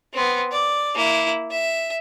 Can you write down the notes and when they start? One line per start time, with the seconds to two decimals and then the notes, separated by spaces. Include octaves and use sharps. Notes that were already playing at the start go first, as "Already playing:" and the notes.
0.13 B3 C4
0.52 D5
0.95 A#3 E4
1.51 E5